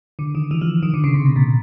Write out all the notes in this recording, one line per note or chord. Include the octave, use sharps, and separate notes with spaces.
D3
D#3
E3
F3
D#3
D3
C#3
C3
B2
A#2